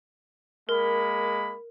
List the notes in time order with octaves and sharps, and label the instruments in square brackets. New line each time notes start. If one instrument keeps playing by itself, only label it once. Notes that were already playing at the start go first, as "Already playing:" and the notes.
[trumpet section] G#3 A#3 B5 [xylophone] A#4